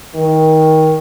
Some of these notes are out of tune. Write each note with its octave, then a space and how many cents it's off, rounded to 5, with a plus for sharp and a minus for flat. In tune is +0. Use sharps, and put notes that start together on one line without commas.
D#3 +20